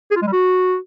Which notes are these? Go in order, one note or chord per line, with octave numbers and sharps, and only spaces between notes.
G#4
F4
G#3
G3
F#4